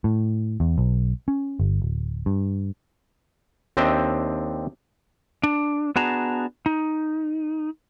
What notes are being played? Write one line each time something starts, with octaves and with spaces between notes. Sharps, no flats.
A2
E2
B1
C#4
G1
D1
G2
D#2 C4 D4 D#5 E5 G5
D4
B3 D4 F#4 G#4 A5 A#5
D#4